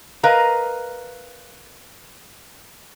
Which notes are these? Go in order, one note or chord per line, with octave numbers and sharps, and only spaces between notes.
A#4 B4 D#5 F5 A#5